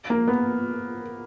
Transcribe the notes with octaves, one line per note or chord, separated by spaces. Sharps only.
A#3
B3